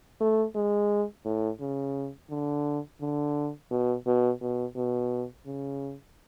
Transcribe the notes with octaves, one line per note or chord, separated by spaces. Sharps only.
A3
G#3
A2
C#3
D3
D3
B2
B2
B2
B2
C#3